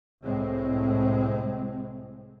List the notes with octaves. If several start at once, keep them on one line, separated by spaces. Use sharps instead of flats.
C2 A2 G#3 C4